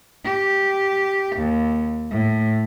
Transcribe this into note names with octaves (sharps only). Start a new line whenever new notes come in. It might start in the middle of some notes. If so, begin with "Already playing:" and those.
G4
D#2
A2